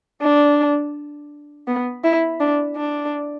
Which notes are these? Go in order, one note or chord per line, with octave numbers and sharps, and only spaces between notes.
D4
B3
E4
D4
D4